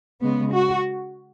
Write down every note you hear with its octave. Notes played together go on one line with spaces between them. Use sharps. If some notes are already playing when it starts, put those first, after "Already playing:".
C#3 G#3 B3
F#4